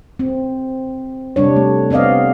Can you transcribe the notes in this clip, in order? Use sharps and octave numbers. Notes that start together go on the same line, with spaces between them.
C4
C3 G3 D4 C#5
A3
B3 C4 D5 D#5 F5